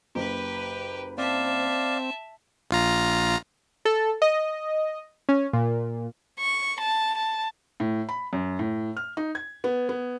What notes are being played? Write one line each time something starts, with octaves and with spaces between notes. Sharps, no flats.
F#1 G4 B4
C4 D5 E5 F5 A5
A#1 F4 A#5
A4
D#5
C#4
A#2
C#6
A5
A5
A2
B5
F#2
A2
F6
D#4
G#6
B3
B3